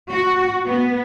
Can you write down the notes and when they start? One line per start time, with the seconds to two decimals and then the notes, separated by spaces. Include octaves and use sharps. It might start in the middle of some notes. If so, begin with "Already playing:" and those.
0.11 F#4
0.67 B3